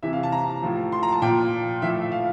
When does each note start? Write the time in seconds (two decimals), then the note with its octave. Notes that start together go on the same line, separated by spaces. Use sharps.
0.03 C3 E3 E5
0.13 F5
0.23 A5
0.32 A#5
0.63 A2 F3
0.92 C6
1.03 A#5
1.12 A5
1.22 A#2 F3 G5
1.82 A2 F3 E5
2.02 E5
2.12 F5